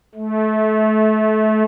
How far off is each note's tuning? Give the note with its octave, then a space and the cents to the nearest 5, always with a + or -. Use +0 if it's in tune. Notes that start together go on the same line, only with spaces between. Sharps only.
A3 -30